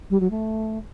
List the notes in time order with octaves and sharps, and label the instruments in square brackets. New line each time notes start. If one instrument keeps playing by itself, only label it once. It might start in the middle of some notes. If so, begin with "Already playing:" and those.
[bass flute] G3
F#3
A3